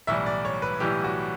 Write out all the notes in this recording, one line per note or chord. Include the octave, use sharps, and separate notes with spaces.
B1 A2 E3 G3 E5
D5
C#5
B4
B1 A2 E3 G3 G4
F#4